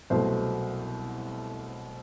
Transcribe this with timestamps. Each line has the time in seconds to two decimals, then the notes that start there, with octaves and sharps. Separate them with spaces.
0.10 C2 B2 F#3 A3 C5